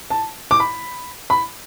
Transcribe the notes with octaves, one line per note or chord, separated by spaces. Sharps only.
A5
D6
B5
B5